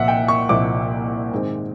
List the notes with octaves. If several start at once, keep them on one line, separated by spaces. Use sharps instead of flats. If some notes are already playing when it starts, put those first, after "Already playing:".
Already playing: C2 A#2 F3 E5 F#5
G5
C#6
C2 A#2 F3 D6
G#2 D#3 G#3 C4